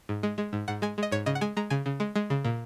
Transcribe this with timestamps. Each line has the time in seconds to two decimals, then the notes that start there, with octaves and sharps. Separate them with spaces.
0.09 G#2
0.23 G#3
0.38 G#3
0.53 G#2
0.68 G#2 F#5
0.82 G#3 G#5
0.98 G#3 D#5
1.11 G#2 C#5
1.26 C#3 D#5
1.35 F#5
1.41 G#3 G#5
1.57 G#3 A#5
1.70 C#3 G#5
1.86 C#3
2.00 G#3
2.15 G#3
2.30 C#3
2.45 A#2